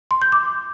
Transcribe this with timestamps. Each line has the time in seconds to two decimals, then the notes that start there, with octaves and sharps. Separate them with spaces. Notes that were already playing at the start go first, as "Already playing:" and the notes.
0.11 C6
0.22 G6
0.32 D6